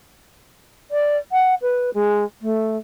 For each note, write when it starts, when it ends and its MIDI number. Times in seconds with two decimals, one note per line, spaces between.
0.91 1.17 74
1.32 1.54 78
1.61 1.90 71
1.94 2.24 56
2.41 2.77 57